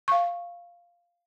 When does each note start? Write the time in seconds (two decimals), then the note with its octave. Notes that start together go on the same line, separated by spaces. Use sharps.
0.08 F5 C#6